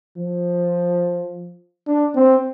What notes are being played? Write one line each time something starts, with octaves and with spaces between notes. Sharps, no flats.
F3
D4
C4